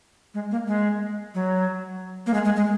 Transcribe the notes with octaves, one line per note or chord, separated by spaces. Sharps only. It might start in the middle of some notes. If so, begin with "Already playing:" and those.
G#3
A#3
G#3
F#3
A#3
G#3
G#3
G#3